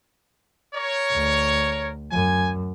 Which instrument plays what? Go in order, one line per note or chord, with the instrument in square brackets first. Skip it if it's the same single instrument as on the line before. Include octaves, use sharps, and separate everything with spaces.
[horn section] A#4 C#5
[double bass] D2
[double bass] F#2 [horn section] G#5